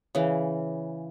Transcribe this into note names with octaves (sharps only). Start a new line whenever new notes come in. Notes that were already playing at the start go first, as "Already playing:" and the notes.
C#3 E3